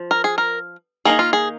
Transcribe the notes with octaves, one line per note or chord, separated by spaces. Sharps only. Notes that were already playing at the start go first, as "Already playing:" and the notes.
Already playing: F3
A#4
G#4
A#4
D#3 A#3 D#4 G#4
F4
G#4